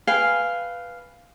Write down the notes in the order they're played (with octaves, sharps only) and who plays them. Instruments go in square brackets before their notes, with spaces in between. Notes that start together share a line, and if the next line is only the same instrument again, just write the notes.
[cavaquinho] B4 F5 G5 G#5